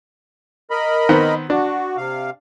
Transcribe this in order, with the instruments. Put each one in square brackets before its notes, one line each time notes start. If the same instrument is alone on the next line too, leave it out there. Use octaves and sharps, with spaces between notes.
[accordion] A#4 D#5 B5
[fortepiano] D#3 B3 C4
[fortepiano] D4 [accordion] F#4
[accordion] C3 F5